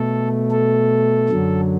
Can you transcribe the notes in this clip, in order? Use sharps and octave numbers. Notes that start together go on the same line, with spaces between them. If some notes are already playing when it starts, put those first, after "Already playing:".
Already playing: B2 A3 A4
A4
F#2 D3 F#3